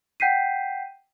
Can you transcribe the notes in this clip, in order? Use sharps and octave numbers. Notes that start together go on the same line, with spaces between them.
F#5 G5 G6 B6 C7 D#7